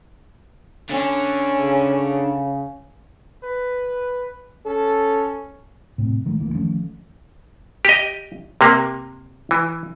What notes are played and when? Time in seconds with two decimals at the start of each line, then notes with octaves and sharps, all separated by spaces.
0.90 D3 C#4
1.59 C#3
3.43 B4
4.66 C#4 A4
5.98 D#1 A2 C3
6.26 D#3 F#3 G#3 A3
6.38 F#1 D2 E3 A#3
6.54 D#3 F3 A3 C#4
7.85 G4 D#5
8.61 C3 A#3
9.51 E3